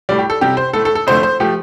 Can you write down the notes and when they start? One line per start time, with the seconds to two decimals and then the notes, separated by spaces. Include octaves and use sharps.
0.09 A2 G3 D5
0.19 G4
0.30 A4
0.41 C3 G3 G4
0.57 C5
0.73 A2 A3 A4
0.85 A4
0.95 A4
1.07 F2 D3 A3 C5
1.23 C5
1.40 F3 A3 G4